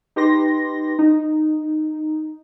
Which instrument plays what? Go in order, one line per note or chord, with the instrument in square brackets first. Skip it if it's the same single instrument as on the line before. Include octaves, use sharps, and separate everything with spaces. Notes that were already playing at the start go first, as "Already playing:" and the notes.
[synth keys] D#4 G4 B4 C6 A#6
D#4